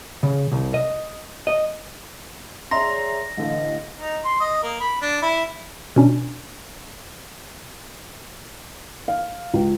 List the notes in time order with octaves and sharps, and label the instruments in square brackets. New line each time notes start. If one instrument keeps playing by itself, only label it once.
[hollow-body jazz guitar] C#3
C2
D#5
D#5
[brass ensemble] G#4 C#5 D5 [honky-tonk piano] E5 A#5 C6 [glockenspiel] A#6
[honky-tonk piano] A1 D3 [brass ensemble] D#5 F5
[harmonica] D#4
C6
D#5
A#3
B5
D4
E4
[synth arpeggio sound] B2 C#4 D4
[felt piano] F5
C#2